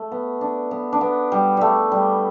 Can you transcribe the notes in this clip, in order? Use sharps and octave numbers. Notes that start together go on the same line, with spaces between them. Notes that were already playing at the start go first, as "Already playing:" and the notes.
Already playing: A3
B3
D4
B3
D4
B3
G3
G3 A3
G3